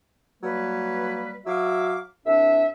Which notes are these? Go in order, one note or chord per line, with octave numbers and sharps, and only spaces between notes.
F#3 G3 A#3 B4
F#3 F#4 E5 F5 D6
C2 D4 E5